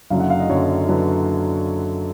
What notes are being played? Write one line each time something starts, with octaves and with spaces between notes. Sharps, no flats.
F#1 F#2 D3 F#3 F5
F#5
F5
D#5
F#1 F#2 D3 F#3 C#5
D3 F#3 B4